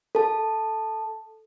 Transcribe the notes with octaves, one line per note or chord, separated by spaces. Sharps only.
A4 A5